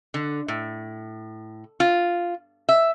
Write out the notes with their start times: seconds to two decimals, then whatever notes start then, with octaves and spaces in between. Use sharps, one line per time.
0.14 D3
0.48 A2
1.80 F4
2.69 E5